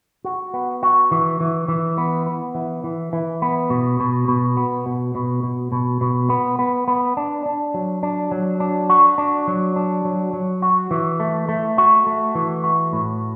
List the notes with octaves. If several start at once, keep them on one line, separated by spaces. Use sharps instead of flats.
F#4
B3
F#4
E3
E3
E3
B3
B3
E3
E3
E3
B3
B2
B2
B2
B3
B2
B2
B2
B2
B2
B3
B3
B3
D4
D4
F#3
D4
F#3
D4
F#4
D4
F#3
D4
F#3
F#3
F#4
E3
A3
A3
F#4
A3
E3
F#4
A2